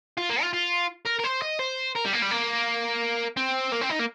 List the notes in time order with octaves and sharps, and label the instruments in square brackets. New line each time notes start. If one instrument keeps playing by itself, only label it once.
[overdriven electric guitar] F4
A#3
F4
F4
A#4
A#4
C5
D#5
C5
A#4
G3
A#3
G3
A#3
C4
A#3
C4
D#4
A#3